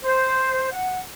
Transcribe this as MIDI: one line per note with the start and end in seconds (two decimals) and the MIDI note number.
0.02 0.69 72
0.70 1.00 78